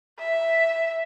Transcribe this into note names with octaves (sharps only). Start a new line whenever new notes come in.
E5